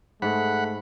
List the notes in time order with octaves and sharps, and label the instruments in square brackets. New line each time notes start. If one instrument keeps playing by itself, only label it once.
[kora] G#2 [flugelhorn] A3 [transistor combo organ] F#5 B5